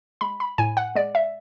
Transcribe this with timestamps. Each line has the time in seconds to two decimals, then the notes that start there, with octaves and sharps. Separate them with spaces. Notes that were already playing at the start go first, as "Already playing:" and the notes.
0.21 G#3 B5
0.40 B5
0.58 A2 G#5
0.77 F#5
0.95 G#3 D5
1.15 E5